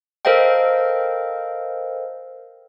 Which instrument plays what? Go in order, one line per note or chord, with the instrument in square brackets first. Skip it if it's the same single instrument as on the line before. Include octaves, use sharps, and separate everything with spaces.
[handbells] A4 A#4 C5 D#5 F5 G5